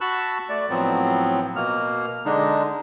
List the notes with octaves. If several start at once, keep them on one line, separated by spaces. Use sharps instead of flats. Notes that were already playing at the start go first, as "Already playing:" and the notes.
F#4 A5 B5 C#6 E6 F#6
A3 D5
A2 F3 F#3 B3 C4
B2 A#3 F6
D3 G#3 D4 D#4